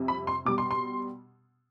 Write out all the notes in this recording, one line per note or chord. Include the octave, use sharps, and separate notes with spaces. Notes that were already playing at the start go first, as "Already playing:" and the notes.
Already playing: F2 C3 G3
B5
C6
B2 G3 D6
C6
C6